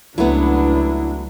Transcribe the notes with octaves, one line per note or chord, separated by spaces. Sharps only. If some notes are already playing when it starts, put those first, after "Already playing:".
C#2 F#3 A3 B3 D4 E4